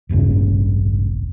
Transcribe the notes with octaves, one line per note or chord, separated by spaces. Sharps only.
E1 A1 G2 C#3